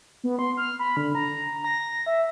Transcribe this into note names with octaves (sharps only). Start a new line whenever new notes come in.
B3
C6
F6
B5
D3
A#5
A#6
E5